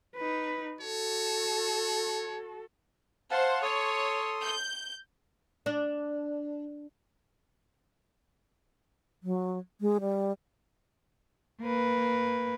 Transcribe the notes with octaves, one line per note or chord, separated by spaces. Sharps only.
D#4 B4
F#4 A4 C#5
C5 F5 F#5 A5
A4 C#5 C6 D#6
G6
D4
F#3
G#3
G3
A#3 B4